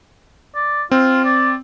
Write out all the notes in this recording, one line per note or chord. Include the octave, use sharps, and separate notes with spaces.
D5
C4 F4
D5